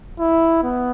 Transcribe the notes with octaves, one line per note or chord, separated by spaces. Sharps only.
E4
B3